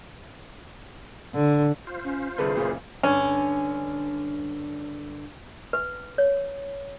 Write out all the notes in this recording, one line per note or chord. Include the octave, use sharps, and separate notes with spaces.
D3
F4 C5
C#4
C2 D3 G#4 B4
F#1 A#2 C#3
G2 D3 C#4 D4
B4
C#5